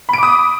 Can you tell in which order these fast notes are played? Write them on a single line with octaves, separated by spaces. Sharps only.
B5 D7 D6 D#6